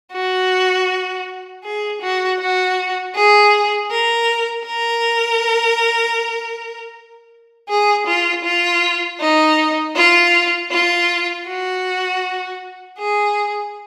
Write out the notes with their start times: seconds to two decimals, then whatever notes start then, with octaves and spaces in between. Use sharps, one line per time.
0.12 F#4
1.64 G#4
2.01 F#4
2.40 F#4
3.15 G#4
3.91 A#4
4.66 A#4
7.69 G#4
8.06 F4
8.44 F4
9.20 D#4
9.96 F4
10.71 F4
11.47 F#4
12.98 G#4